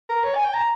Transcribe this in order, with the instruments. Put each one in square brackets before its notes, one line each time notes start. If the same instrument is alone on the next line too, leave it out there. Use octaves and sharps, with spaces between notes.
[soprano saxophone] A#4
C#5
G#5
G5
A#5